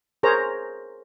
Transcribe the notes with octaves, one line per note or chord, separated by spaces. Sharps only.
G#4 A#4 C5 C#5 A#5